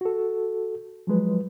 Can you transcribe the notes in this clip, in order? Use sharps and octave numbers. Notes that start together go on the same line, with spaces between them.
F#4 A4
F3 F#3 G#3 B4